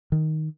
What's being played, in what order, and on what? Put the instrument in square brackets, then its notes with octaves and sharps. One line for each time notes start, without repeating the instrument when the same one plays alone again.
[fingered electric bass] D#3